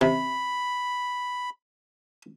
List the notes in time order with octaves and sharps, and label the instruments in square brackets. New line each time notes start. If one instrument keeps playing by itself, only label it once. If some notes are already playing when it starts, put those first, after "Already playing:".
[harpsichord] C3 [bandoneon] B5